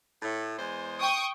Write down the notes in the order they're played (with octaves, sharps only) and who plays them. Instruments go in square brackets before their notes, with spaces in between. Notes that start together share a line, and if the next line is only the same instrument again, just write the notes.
[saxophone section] A2
E2 G#3 C5
[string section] G5 C#6 D#6